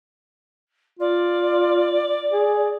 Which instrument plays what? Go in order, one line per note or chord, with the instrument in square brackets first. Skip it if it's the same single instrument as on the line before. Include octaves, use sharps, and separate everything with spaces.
[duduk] F4 [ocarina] D5
[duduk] G#4